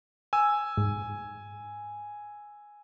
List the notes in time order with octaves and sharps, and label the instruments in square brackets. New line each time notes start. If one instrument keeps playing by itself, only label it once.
[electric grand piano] G#5 E6
[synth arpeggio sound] G#2